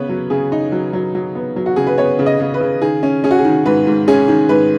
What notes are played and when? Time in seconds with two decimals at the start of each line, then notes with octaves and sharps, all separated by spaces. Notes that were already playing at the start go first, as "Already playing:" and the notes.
Already playing: C#3 B3 B4 C#5
0.09 F#3
0.30 C#3 G#4
0.52 D#4
0.72 F#3
0.93 F#3
1.15 F#3
1.35 B3
1.56 F#3
1.66 F#4
1.76 C#3 G#4
1.87 B4
1.98 B3 C#5
2.19 C#3
2.26 D#5
2.40 C#3
2.54 B4
2.61 C#3
2.82 D#3 G#4
3.03 C#4
3.24 C#4 G#4
3.31 F#4
3.38 G#4
3.45 D#3
3.66 G#2 B4
3.87 G#2
4.08 C#4 G#4
4.28 D#3
4.49 G#2 B4